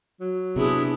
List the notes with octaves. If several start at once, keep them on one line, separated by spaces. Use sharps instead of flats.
F#3
C3 B3 D4 E4 G#4